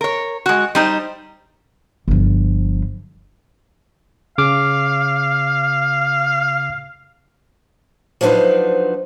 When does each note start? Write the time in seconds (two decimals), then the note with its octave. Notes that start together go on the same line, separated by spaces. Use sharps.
0.01 A#4 C#5
0.46 G#3 F#4
0.75 G3 D#4 C5
2.08 G1 F3
4.38 C#3 F5 D6 F6
8.21 F3 F#3 D4 D#4 B4 C5